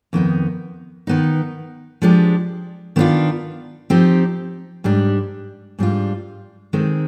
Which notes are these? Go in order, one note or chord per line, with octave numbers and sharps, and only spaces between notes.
F2 D#3 B3 D#4
D#3 B3 D#4
F3 G#3 D4 G4
D#3 B3 D4 F4
F3 C4 D#4 G4
G#2 G3 D4 G4
G#2 G3 D4 F4
D#3 G#3 C4